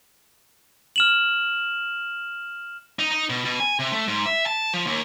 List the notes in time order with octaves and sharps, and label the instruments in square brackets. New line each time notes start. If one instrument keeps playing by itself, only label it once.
[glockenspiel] F6 E7 F#7
[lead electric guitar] D#4
D#4
B2
B2
G#5
C3
A3
G#2
E5
A5
F3
D#2